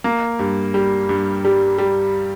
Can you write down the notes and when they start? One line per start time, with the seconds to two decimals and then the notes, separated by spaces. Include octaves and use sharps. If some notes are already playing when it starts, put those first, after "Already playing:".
0.04 A#3
0.39 G2
0.74 G3
1.09 G2
1.45 G3
1.78 G3